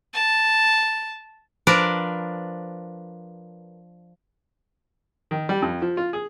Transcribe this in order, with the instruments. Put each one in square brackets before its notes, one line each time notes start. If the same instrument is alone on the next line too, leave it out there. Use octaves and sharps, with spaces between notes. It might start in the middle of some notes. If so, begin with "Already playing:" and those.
[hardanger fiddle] A5
[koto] F3 D4 A#4 B4 D5
[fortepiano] D#3
G3
F2
F3
F4
G#4